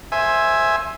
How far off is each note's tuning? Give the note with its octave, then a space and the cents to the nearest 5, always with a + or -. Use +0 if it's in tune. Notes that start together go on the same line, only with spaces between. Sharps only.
C5 +20 E5 +0 G#5 +0